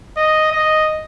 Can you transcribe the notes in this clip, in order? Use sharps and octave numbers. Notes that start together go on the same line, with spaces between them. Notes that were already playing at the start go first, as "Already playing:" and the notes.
D#5
D#5